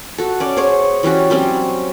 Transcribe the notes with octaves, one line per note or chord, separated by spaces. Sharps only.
F#4 A4
C#4 D5
G#4 C5 C#5 F#5
E3 G3 C#4 F#4
F#3 G3 C4 C#4